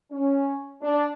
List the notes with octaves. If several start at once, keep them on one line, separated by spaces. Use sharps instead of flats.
C#4
D4